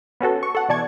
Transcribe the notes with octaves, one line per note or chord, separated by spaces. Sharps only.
B3 C#4 F#4 A4
C#6
A4 F#5
B2 E3 D5 A5 C#6 G#6